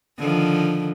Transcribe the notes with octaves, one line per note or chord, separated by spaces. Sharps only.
D3 D#3 F3